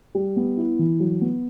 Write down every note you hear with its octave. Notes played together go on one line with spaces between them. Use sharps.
G3
B3
E4
E3
F#3
B3